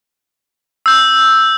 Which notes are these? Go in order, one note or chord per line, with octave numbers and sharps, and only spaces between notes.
E6 G6